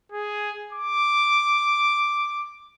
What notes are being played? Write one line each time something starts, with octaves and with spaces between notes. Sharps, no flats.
G#4
D6